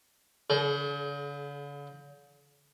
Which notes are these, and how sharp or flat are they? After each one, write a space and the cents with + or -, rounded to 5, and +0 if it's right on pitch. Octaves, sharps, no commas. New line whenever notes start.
D3 -45 G#4 +35